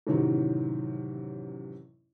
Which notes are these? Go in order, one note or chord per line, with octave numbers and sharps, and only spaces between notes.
A1 F#2 C3 D#3 E3 F#3